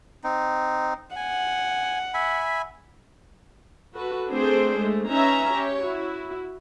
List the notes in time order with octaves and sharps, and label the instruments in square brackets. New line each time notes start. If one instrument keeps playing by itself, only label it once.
[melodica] C4 D#4
[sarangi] F#5 [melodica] G#5
[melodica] E5 G#5 B5
[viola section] F#4 A4 B4
A3 C4 D4 G#4 C5
G#3 A3
C#4 D#4 B4 E5 A#5
G4 C#5
E4 F#4